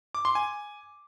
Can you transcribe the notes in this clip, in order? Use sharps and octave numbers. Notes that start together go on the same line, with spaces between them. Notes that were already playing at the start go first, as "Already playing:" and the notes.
D6
C6
G#5